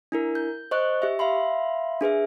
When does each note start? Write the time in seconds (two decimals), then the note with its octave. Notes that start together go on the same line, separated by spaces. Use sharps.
0.12 D4 E4 A#4
0.35 G6
0.71 C5 D#5 C#6 F#6
1.02 G4 E5
1.19 E5 F5 B5 C6
2.01 D4 G#4 B4 E5